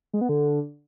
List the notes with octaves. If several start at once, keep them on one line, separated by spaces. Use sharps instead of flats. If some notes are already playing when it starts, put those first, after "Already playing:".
G#3
B3
D3